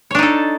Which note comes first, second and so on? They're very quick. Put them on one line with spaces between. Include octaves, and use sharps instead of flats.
C#5 D4 D#4 A4